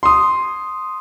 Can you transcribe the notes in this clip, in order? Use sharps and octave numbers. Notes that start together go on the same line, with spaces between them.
C6 D#6